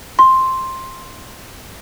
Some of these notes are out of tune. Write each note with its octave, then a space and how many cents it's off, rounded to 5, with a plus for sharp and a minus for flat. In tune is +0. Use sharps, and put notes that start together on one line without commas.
C6 +5